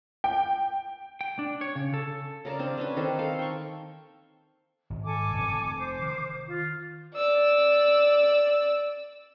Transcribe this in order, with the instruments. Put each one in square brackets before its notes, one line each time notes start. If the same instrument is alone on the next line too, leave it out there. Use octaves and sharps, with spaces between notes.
[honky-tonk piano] G5
[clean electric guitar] G5
D4
C#5
C#3
A4
[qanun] C#3 A#4 D5 A5
C4 D4
C#4 D4 B4
D#3 C4 A4
A4 F5
G5 C#6
[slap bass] G#1
[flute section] A4 G#5 D6
[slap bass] F1
[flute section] C5 D6
[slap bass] D#3
[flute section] F4
[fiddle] D5 E6